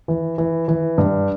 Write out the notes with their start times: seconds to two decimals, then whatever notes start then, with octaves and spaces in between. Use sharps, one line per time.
0.08 E3
0.38 E3
0.68 E3
0.98 G2